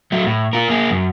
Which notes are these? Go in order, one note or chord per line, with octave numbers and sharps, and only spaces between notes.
F#3 A3
A2
F4 A#4
A#3 G#4
F#2